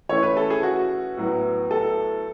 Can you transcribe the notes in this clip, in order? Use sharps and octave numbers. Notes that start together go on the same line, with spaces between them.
E3 A3 C#4 C#5
B4
A4
G#4
F#4
A2 F#3 B3
A4